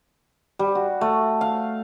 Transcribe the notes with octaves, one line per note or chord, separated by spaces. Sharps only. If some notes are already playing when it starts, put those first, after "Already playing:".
G3
F#4
A3
F5